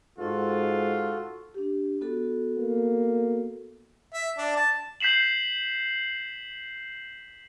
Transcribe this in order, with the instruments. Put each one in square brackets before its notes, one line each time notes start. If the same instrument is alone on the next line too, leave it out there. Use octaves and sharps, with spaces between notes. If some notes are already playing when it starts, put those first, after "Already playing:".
[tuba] G#2 [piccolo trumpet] F4 [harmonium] F#4 A4
[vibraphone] D4 G4
B3 F#4 A4
[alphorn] A#3
[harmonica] E5
D4
A5
[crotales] G6 B6 C7 E7 F#7